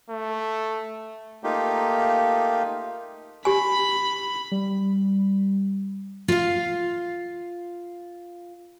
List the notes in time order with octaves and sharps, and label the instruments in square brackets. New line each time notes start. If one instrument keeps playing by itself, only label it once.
[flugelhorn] A3
[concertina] A3 A#3 D#4 F4 G4
[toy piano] G4 G#5 [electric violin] B5
[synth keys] G3
[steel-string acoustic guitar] F4 F5